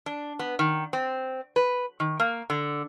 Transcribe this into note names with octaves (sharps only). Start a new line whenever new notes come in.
D4
B3
D#3
C4
B4
D#3
A#3
D3